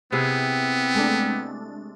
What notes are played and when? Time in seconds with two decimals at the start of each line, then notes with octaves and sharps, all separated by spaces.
0.12 C3 B3 C4 E4 G#4
0.95 G#3 A3 D4